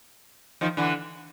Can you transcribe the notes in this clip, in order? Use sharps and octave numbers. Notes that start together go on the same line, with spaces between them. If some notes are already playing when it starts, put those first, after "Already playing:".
D#3 F3
D3 E3